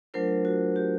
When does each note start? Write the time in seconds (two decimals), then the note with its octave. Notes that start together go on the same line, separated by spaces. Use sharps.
0.14 F#3 A3 D4 F4 A#4 C5
0.45 F#4
0.76 G4